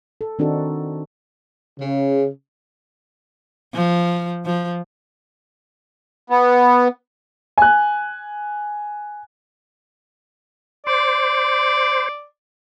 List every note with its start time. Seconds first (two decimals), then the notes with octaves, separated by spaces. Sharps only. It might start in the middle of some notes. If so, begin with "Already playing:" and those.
0.21 A4
0.39 D#3 C4 D4 D#4 F#4 A4
1.79 C#3
3.75 F3
4.46 F3
6.30 B3
7.58 G#5 F#6
10.87 C5 D5